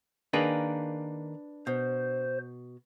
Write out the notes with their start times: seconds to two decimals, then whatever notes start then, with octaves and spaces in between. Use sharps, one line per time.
0.33 D#3 A#3 D4 G#4 B4
1.67 B2 C5